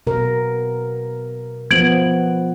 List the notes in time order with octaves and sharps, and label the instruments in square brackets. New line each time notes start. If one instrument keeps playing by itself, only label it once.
[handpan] B2 A#4
[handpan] F3 B3 [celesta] G#6 D7 F#7